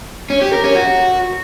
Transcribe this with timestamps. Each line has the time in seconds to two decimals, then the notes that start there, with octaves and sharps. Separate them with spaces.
0.30 C#4
0.41 G4
0.53 A#4
0.64 C#4
0.75 F#4